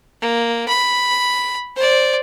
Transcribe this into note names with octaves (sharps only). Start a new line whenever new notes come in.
A#3
B5
C5 D5